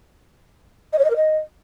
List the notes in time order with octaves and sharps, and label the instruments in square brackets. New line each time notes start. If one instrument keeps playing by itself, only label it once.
[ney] D#5
C#5
D#5
A#4
D#5